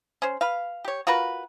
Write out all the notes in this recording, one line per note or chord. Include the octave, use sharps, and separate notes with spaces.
C#4 C5
B4 F5
G4 C#5
F4 F#4 A#4 B4